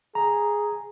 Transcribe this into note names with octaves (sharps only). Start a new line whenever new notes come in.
G#4 A#5